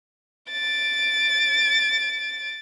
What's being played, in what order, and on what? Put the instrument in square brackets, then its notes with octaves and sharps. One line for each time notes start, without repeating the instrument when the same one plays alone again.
[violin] A6 D7